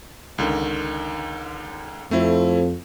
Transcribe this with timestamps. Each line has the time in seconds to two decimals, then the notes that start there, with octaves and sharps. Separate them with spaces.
0.38 C#2 D3 D#3
2.11 F2 A3 C4 E4